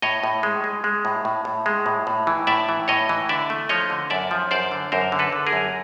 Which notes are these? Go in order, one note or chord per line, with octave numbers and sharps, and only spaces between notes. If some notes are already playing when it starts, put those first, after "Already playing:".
A2 C#5 D#5
A2
G#3
G#3
G#3
A2
A2
A2
G#3
A2
A2
E3
A2 D5 E5
E3
A2 C#5 D#5
E3
D3 D5 E5
A3
F3 C#5 D#5
D3
F#2 D5 E5
F3
F#2 C5 D5
D3
F#2 A#4 C5
D3
A4 B4
D3
G#4 A#4
F#2